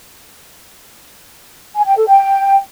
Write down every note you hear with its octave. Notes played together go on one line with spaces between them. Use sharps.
G#5
G5
A4
G5